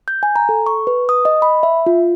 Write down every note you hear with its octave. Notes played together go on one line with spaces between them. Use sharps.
G6
G#5
A#5
A4
C#6
B4
D#6
D#5
B5
E5
F4